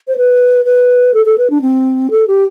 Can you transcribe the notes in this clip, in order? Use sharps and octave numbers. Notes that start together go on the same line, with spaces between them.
C5
B4
B4
A4
A4
B4
D4
C4
A4
G4